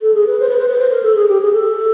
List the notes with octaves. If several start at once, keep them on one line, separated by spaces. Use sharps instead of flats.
A4
G#4
B4
C5
B4
C5
B4
C5
A#4
A4
G#4
G4
G#4
A4